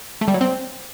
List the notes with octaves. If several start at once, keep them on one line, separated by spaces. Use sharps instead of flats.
A3
G3
F#3
C4